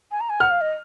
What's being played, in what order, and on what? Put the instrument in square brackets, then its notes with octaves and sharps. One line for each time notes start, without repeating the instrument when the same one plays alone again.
[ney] G#5
A#5
G#5
[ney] F#5 [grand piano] F6
[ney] F5
D#5